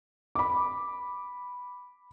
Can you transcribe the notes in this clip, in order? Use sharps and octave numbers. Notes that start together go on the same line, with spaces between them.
B5 D6